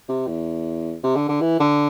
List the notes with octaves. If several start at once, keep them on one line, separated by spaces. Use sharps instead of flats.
C3
E2
C3
D3
D3
E3
D3